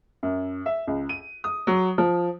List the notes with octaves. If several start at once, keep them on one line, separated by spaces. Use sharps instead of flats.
F#2
E5
C#2
D#7
D#6
F#3
F3